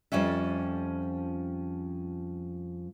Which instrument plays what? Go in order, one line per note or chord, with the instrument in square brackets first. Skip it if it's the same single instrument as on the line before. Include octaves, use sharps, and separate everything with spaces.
[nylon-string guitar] F2 F3 G3 C#4 E5